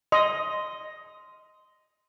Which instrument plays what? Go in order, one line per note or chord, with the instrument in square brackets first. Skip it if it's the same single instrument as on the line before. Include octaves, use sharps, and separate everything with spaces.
[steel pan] D#5 [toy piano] C6